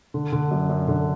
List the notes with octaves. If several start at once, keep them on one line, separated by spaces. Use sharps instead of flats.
D3
D3
F#2
F#2
D3